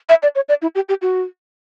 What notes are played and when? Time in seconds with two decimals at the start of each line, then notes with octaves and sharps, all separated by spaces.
0.09 E5
0.23 D5
0.35 C#5
0.49 D5
0.62 E4
0.75 G4
0.89 G4
1.02 F#4